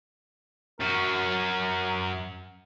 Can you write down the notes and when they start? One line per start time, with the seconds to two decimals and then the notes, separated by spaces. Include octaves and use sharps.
0.80 F#2 F#4 A#4